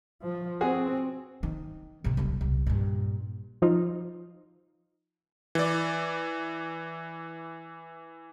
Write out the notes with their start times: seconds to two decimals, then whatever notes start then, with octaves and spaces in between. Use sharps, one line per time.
0.22 F3
0.61 C4 F#4 G#4
1.43 D#3
2.04 A1 C3
2.17 D#1 B1
2.41 C2
2.67 G2 A#2
3.62 F3 D#4 F4
5.55 E3 D5